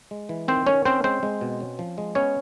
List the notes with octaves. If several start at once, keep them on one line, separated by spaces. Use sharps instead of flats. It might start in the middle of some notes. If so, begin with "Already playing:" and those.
G#3
E3
D#3 C4 C5
D#3 C#4 C#5
C4 C#4 C5
G#3 C4 C5
G#3
B2
C#4
F3
G#3
B3 C#4 C#5